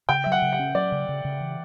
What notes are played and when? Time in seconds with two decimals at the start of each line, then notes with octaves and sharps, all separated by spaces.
0.09 C#3 G5
0.24 F#3 E5
0.32 F#5
0.42 C#3
0.53 F#5
0.59 C#4
0.75 F#3 D5
0.92 C#3
1.09 C#3
1.25 C#3
1.40 E3